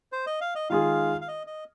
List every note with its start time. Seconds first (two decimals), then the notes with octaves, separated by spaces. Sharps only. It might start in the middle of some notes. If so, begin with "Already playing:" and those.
0.12 C5
0.27 D#5
0.41 F5
0.55 D#5
0.69 D#3 G#3 F4 G#4 F5
1.21 F5
1.28 D#5
1.47 D#5